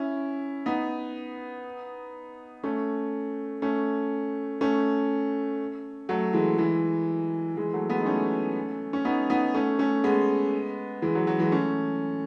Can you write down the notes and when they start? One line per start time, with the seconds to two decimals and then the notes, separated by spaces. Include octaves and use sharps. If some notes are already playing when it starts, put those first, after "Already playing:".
Already playing: C#4 E4
0.66 B3 D#4
2.63 A3 C#4
3.62 A3 C#4
4.61 A3 C#4
6.09 F#3 A3
6.33 E3 G#3
6.58 E3 G#3
7.57 E3 G#3
7.73 F#3 A3
7.90 G#3 B3
8.00 D#4
8.06 A3 C#4
8.93 C#4
9.05 B3 D#4
9.30 B3 D#4
9.54 A3 C#4
9.79 A3 C#4
10.04 G#3 B3
11.02 E3 G#3
11.15 F#3
11.27 F#3
11.39 E3 G#3
11.52 A3 C#4